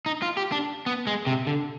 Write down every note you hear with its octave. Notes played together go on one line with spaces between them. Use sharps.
D#4
F4
G4
D4
B3
G#3
C3
D3